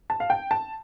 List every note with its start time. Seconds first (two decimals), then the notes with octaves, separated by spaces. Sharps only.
0.10 A5
0.20 F5
0.30 G5
0.51 A5